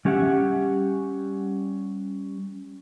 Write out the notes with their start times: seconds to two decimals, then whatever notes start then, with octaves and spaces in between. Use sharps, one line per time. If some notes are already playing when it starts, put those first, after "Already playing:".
0.05 G3 C#4 G4 E5 F#5